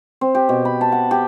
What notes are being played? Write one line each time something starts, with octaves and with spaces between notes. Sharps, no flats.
C4
G4
B2
B5
A5
F#5
G4